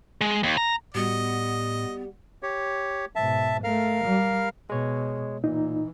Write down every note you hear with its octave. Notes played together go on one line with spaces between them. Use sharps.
G#3
D#2
A#5
A2 G3 B3 F#4 D#5
G4 C#5
G#2 B2 E5 A5
A3 A#4 F5 F6
G3
B2 G#3 C#5
A#2 E3 D#4